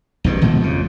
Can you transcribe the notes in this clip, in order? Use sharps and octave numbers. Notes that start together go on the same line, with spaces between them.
A#1 G2 B2
G#1 B2 F3 A3
F2 C#3